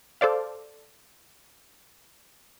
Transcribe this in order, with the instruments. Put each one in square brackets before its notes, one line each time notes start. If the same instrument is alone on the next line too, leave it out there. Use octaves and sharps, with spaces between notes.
[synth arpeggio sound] A4 C5 D5 F5